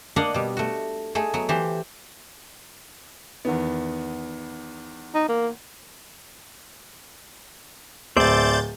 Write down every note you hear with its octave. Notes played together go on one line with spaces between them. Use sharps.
A#3 D4 D#5 F5 F#5 A#5
B2 G3
A3 F#4
A3 D#4 G#4
F#3 B3
E3 G4 C5
E2 D#3 B3
D#4
A#3
D1 C5 D5 E5 G6 A6